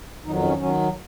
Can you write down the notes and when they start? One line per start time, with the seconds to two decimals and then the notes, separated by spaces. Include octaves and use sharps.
0.25 F2 D#3 F#3 D#4
0.36 D#4
0.42 C#4
0.57 D#3 F#3 C#4